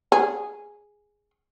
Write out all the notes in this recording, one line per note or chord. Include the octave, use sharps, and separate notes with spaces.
G#4